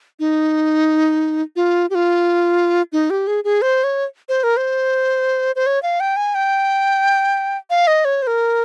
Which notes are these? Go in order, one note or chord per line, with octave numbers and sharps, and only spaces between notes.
D#4
F4
G4
F4
D#4
G4
G#4
G#4
C5
C#5
C5
A#4
C5
C5
C#5
F5
G5
G#5
G5
F5
D#5
C#5
C5
A#4